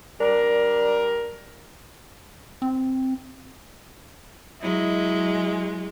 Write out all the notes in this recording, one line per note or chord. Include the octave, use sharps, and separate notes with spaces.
G3 D4 A#4
C4
F#3 G#3 E4 D#5